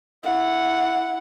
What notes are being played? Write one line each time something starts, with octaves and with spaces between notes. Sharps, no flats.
E4 F#5